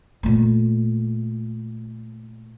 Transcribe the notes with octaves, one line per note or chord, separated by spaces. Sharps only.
A#2 A3